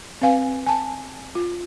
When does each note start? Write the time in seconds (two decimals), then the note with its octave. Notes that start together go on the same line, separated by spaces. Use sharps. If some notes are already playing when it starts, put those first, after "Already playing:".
0.22 C4 B4 F5 G#5
0.66 G#5 A5
1.35 F4